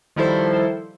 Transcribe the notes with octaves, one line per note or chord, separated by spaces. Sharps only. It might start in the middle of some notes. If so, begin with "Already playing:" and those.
D#3 F3 G3 E4 A4 C5